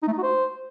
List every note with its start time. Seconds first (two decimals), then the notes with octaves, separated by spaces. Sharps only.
0.02 D#4
0.07 A3
0.13 D#4
0.18 F#4
0.23 C5